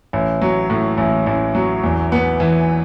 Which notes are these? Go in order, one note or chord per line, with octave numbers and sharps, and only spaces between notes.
A1
F#3
A2
A1
A1
F#3
E2
B3
E3